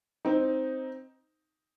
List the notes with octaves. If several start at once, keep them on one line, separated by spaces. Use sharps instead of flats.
C4 D#4